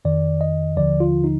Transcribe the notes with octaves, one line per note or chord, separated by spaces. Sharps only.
F2 D#3 D5
D#5
D#2 D3 F3 D5
F4
D#4